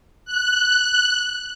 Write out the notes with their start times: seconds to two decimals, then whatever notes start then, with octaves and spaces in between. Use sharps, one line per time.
0.25 F#6